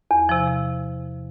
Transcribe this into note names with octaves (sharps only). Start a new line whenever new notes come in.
E2
C3 F3
C3